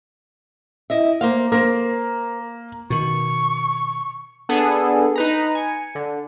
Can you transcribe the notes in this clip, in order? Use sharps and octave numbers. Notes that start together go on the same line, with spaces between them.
E4 D#5 E5
A#3 C5 F5
A#3 A#4 C5
B2 D#3 C#6
B3 D4 G#4 A4
D#4 B4 A#5
G#5 C#7
D3